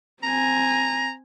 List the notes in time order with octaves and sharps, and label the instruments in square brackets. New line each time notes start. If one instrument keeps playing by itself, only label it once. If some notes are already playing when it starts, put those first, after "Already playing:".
[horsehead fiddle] C4 G#5 [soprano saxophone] A#5